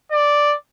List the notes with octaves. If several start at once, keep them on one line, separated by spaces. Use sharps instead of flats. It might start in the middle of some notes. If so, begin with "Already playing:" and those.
D5